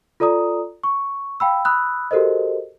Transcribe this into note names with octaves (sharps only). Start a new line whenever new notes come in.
F4 A4 D5 A#5 D#6
C#6
F5 G5 B5 E6
B5 D#6 E6 F#6
F#4 G4 A4 A#4 C5 D#5